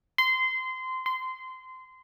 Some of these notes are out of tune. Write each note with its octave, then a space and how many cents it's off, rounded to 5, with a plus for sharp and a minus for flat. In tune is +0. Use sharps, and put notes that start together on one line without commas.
C6 -20
C6 -20